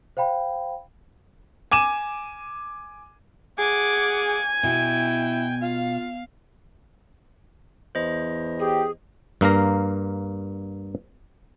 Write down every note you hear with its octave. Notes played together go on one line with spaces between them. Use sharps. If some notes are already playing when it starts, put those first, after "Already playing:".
C5 F5 G5 B5
G#5 D6 D#7 E7
G#4 F#5 G#5 D6
B2 E4 G5
F4 F5
E2 C5 D#5
G4 G#4
G2 A#3 F5 A#5